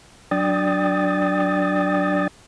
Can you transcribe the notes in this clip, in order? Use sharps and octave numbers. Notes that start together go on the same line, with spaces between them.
F#3 D4 D5 G5 D#6 A6